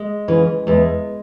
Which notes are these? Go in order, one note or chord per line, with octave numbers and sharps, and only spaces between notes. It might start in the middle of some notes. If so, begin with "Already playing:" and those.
Already playing: G#3
C#3 E3
E2 G#3